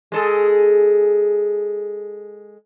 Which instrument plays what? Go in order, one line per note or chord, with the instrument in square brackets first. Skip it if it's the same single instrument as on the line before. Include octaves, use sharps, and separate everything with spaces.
[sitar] G#3 G#4 A4